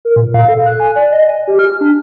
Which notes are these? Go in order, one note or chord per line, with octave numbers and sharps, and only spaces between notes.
A#4
A#2
F5
A4
F#6
G#5
D5
D#5
G#5
G4
F6
D4